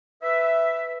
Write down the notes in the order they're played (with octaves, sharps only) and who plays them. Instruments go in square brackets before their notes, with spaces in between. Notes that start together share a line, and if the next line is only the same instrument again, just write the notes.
[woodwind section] B4 E5